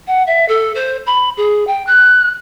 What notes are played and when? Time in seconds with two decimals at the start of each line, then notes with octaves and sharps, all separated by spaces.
0.08 F#5
0.27 E5
0.48 A4
0.75 C5
1.07 B5
1.37 G#4
1.67 G5
1.87 F#6